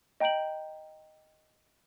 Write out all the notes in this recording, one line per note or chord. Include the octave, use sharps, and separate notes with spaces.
D#5 G5 A#5 G6 D7 F#7